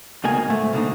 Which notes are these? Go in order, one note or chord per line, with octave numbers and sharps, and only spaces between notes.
C#2 B2 A#3 D#4 G#5
G#2 A3
B2 D3 A#3 D#4